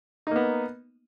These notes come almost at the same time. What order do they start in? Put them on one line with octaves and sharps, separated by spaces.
D#4 A#3 B3